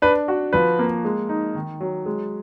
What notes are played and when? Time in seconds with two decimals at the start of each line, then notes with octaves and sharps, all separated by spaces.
0.02 D4 B4
0.28 F#4
0.53 F3 B4
0.79 A#3
1.05 G#3
1.29 D#4
1.55 D#3
1.81 F#3
2.06 G#3